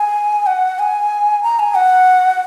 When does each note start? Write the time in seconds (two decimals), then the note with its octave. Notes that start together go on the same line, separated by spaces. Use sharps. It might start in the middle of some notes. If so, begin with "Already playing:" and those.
Already playing: G#5
0.46 F#5
0.79 G#5
1.43 A#5
1.60 G#5
1.75 F#5